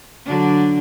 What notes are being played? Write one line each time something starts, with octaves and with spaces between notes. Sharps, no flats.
D3 F#3 D4